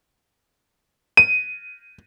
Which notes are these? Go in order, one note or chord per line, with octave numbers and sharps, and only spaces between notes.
D#7